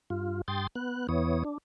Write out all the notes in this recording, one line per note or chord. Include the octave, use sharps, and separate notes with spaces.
G2 F4
G2 G5 C6 D#6 A6
B3 F#6
E2 E3 B3 C#5 D#6
D4